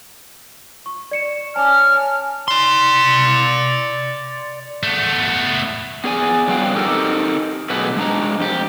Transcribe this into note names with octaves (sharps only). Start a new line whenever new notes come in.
C#6
D5 C#7 E7
C#4 G#5 A5 D6 F6
G#5
D5 C6
A3 B3
B3 G#4 D5 G#5
F2 F#3 G3 B3 F5 G5
C4 D#4 G4 A4 A#4
B2 D3 F#3 A3 G#4 B4
G#3 D4 A#5
F2 G4